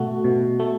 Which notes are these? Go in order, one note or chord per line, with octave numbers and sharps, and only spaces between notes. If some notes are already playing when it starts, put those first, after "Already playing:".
Already playing: B2 A3 F#4
B2
A3